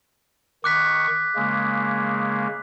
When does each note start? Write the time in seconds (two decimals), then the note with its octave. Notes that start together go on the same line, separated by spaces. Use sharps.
0.64 D#3 C#6 D6 F#6 B6
1.35 C#3 G#3 A#3